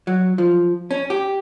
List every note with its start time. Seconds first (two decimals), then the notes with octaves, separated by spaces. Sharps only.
0.07 F#3
0.38 F3
0.91 C#4
1.10 G4